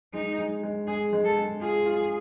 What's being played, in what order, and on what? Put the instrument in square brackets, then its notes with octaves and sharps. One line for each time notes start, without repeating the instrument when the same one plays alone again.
[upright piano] G#3 [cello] D#4
[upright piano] G#3
G#3
[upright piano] G#3 [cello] G#4
[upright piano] G#3
[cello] A4
[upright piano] G#3
[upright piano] F4 [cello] G#4
[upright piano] F4